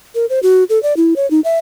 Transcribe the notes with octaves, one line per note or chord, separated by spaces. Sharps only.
A#4
C5
F#4
A4
D5
E4
C#5
D#4
E5